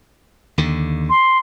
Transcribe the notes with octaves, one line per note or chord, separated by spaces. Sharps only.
D#2 D3
C6